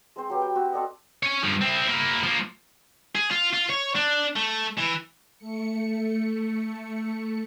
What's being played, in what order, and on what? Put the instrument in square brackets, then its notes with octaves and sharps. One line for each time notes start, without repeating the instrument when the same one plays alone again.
[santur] G#3 C4 C5
F#3 G4 B4
G5
C4 F#4
C4 A4 D5 D#5
[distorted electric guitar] C#5 G#5
G2 F3
C4 E4
A#3 E4
F3 A#3
G#4
F4
F4
C#5
D4
A3
E3
[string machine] A3 C#7